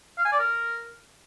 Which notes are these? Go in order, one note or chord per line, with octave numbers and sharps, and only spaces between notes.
F5
G#5
D5
A#4